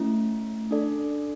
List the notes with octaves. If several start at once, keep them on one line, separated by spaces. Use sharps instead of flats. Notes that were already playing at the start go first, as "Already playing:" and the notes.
Already playing: A3 C#4 E4
D4 A4 D5